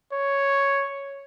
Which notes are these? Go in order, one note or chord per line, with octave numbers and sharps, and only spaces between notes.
C#5